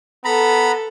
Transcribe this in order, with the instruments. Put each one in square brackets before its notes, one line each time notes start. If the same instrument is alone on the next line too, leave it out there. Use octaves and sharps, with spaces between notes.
[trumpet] B3 [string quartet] A4 [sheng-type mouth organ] A#5 B5